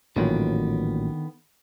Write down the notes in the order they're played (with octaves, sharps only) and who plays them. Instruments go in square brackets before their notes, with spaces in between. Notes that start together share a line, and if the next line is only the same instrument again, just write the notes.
[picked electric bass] A1 A#2 F#3 [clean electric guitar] D3 D#3 B3